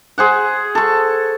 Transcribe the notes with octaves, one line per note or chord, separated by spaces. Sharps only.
G#4 C5 F#5
A4 C#6